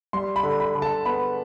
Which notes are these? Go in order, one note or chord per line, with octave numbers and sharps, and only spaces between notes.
G3 C6
B5
D3
B5
D3
A5
B3 B5